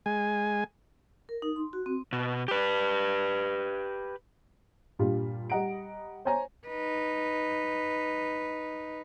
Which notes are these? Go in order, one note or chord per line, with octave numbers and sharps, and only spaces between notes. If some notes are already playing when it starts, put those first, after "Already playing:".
G#3 G#5
A#4
D#4
C6
F#4
C4
B2
G4 B4
G2 A#2 G3 F4
G3 D#5 F#5 A#5 D7
C5 C#5 G#5 A#5
D#4 B4